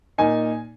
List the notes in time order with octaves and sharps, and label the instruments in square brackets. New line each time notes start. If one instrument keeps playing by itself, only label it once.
[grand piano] A#2 A#3 D#4 G#5